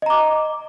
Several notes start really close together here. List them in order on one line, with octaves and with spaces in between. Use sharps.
D#5 A#5 D6